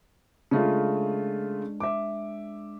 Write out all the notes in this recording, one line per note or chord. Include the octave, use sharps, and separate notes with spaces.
C#3 G#3 A3 D4 F4
E5 D6